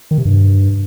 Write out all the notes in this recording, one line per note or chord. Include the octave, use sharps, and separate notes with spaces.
D#3
C3
G2